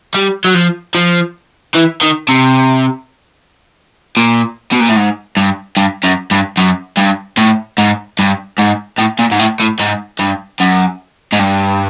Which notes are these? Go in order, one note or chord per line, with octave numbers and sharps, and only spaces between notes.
G3
F#3
F3
F3
E3
D#3
C3
A#2
B2
A#2
A2
G#2
G2
G2
F#2
G2
F#2
G2
A2
G#2
G2
G#2
A2
A#2
G#2
A2
A2
G#2
G2
F#2
G#2
G2